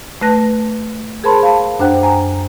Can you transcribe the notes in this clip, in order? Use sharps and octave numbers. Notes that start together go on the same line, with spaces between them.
A3 B4 A5 F#6 A#6
G#4 A#4 C5 A5 B5 C6
F5 A5
F#2 D4 C5 F#5 G5 F#6
G#5 A#5